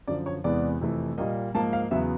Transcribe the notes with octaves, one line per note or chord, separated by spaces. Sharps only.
F#2 D3 F3 D5
C#5
E2 C3 E3 G#3 B3 D5
F2 C3 E3 A3
A#2 G3 A#3 D#5
G#2 F3 A#3 A5
F5
E2 C#3 F#3 B3 E5